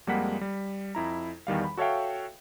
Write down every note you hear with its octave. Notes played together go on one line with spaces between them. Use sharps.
F2 G3 G#3 A#3 F#5 B6
G3
F2 E4 A#5
E2 D#3 G3 F5
B5
F#4 A4 C#5 E5 F5 G5